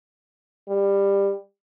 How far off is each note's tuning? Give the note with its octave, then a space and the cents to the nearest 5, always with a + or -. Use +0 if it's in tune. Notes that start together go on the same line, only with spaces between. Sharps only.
G3 +15